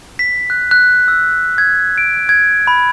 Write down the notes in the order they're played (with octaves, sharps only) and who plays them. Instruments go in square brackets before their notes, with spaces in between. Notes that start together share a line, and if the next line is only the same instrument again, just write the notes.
[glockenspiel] B6
F#6
F#6
E6
G#6
D7
G#6
B5